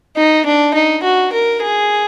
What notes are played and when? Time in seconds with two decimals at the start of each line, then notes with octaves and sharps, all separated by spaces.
0.17 D#4
0.46 D4
0.74 D#4
1.03 F#4
1.33 A#4
1.62 G#4